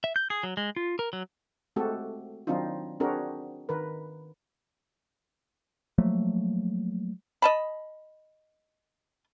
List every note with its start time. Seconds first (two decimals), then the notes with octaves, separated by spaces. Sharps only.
0.04 E5
0.16 G6
0.30 G#4
0.43 F#3
0.57 G#3
0.76 F4
0.99 A#4
1.13 F#3
1.76 G#3 A3 C4 F#4 G4 A4
2.47 D#3 F#3 C4 D4 D#4 F4
3.00 C4 D4 F#4 G#4 A#4
3.69 D#3 A#4 B4
5.98 F3 F#3 A3 A#3
7.42 D#5 A5 B5